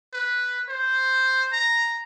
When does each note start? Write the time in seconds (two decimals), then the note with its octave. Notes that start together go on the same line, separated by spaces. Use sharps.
0.13 B4
0.69 C5
1.52 A#5